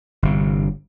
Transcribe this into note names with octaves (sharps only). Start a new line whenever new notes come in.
G1 C3